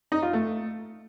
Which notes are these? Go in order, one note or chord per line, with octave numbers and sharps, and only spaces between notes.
D#4
F4
A3